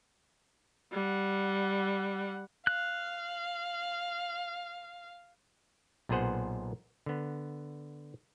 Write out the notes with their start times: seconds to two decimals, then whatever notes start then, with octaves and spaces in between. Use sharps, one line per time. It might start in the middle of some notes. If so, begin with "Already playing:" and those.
0.92 G3 F#5
2.67 F5 F#6
6.09 B1 A#2 B3 G#4 C5 F#5
7.06 D3 B3